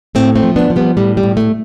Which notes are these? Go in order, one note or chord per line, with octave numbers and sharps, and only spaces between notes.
A2 A3 C4
A3 C4
F3
B3 D4
F3
G3 B3
A2 G3
G3
A2
A3